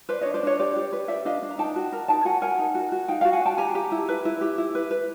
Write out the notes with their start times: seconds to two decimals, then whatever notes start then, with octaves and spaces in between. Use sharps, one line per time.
0.09 B4 C5 D5
0.21 D4 C#5 D#5
0.34 C5 D5
0.43 D4 C#5 D#5
0.59 G4 C5 D5
0.76 G4
0.93 B4
1.08 G4 D5 E5
1.25 D4 D#5 F5
1.42 D4
1.51 A#5
1.58 D#4 G5 A5
1.76 F#4
1.93 A#4
2.08 D#4 G5 A5
2.25 F#4 F#5 G#5
2.42 A#4 F#5 G#5
2.59 D#4
2.75 F#4
2.92 F#4
3.08 D#4 F5 G5
3.21 F#4 F5 G5
3.33 F#5 G#5
3.41 F#4 G5 A5
3.58 G4 G#5 A#5
3.75 G4
3.92 E4
4.09 B4
4.25 E4
4.41 G4
4.58 E4
4.75 B4
4.91 B4